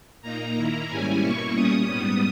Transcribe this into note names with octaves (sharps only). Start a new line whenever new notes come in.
A#2 A#3 D#4 A#5
D#3 A#3 E4
G#2 G3 C#4 E4 G#5
B2 A#3 E4 C#6
A#2 G3 C#4 D#6
G#2 G3 B3